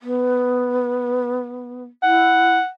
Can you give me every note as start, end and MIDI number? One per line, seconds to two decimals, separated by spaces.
0.01 1.84 59
2.03 2.58 64
2.03 2.68 78